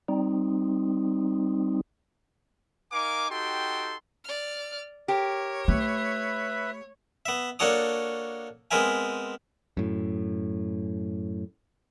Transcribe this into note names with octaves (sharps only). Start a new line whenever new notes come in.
G3 C4 D#4
D#4 A#4 F5 G#5 D6
D#4 F#4 G4 A4 G5 C6
D5 F6
G4 A#4 C#5
A3 B4 E5 B5
B3 E5
A#3 D4 F#4 A4 C#5 D#6
G#3 B3 C4 A#4 E5 G#5
F#2 A2